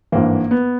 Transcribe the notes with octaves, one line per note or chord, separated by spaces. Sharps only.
G#1 G2 E3 A#3
B3